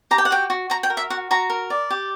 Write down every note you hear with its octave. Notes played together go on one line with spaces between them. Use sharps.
G4 A#5
G5
F#5
F#4 G5
F#4
F#4 A#5
G5
A#4
E5
F#4 F#5
F#4 A#5
A#4
D5
G4